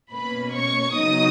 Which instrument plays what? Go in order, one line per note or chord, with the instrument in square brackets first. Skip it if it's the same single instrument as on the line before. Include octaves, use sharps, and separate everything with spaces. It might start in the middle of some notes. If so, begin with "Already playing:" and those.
[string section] B2 A#3 C#4 B4 B5
C#5 C#6
C#3 F#3 B3 D#4 D#5 D#6